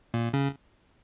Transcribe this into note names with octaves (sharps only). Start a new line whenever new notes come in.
A#2
C#3